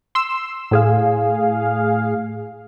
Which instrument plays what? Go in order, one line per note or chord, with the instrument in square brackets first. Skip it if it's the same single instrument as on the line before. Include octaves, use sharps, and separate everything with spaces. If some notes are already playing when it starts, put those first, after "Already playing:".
[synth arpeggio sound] C6 E6
A2 G#4 F5